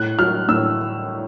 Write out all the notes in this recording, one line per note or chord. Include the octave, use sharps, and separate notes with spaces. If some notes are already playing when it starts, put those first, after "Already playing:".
Already playing: A2 F#6
F#3 F6
A2 E6